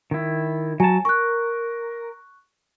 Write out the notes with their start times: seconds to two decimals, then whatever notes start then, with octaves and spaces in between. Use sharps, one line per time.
0.11 D#3 E4
0.80 F#3 G#5 A5
1.05 A#4 C#6 F#6